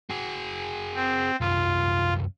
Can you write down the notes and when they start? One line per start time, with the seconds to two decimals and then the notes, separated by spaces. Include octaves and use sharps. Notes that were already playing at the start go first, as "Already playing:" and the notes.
0.11 F#4 G#4
0.94 C4
1.41 C2 F#2 F4